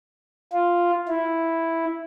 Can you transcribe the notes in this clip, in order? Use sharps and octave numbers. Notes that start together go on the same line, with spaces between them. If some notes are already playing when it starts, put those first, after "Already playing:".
F4
E4